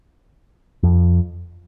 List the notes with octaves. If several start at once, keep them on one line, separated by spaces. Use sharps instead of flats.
F2